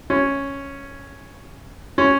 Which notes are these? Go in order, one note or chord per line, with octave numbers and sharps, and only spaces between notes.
C#4
C#4